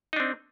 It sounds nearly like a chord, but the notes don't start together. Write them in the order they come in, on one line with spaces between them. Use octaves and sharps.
D#4 D4 C4